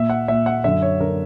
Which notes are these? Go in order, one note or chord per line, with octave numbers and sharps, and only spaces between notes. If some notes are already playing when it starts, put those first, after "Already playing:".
Already playing: A#2 E5
F#5
A#2 E5
F#5
F#2 D3 E5
C#5
D3 A#4